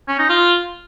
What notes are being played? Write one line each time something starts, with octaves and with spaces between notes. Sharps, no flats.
C#4
D#4
F4